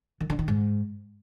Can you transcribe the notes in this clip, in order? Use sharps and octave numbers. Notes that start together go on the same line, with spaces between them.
D#3
D3
D#3
G#2